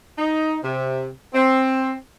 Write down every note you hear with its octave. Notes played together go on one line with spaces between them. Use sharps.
D#4
C3
C4